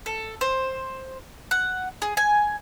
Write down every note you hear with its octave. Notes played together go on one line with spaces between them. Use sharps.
A4
C5
F#5
G#4
G#5